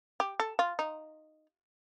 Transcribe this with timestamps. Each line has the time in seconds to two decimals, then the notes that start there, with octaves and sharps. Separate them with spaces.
0.20 G4
0.40 A4
0.59 F4
0.79 D#4